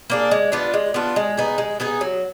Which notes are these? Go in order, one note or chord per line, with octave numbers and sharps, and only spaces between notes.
A#3 D4 G#4
G#3
B3 D4 F4
G#3
B3 D4 F4
G#3
B3 D#4 G#4
G#3
B3 D#4 G#4
F#3